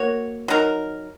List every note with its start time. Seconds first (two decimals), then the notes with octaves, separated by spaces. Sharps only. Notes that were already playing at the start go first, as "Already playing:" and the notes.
Already playing: A#3 F#4 C#5
0.48 F#3 D#4 A#4